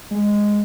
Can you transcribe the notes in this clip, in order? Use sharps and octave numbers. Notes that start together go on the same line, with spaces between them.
G#3